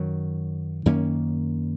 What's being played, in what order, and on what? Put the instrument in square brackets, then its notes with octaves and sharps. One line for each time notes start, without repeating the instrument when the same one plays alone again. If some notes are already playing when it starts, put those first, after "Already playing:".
Already playing: [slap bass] F#2 D#3 F#3
F#2 D#3 A#3 C#4